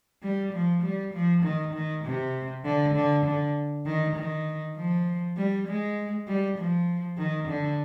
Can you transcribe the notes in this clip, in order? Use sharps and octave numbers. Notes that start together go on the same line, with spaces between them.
G3
F3
G3
F3
D#3
D#3
C3
D3
D3
D3
D#3
D#3
F3
G3
G#3
G3
F3
D#3
D3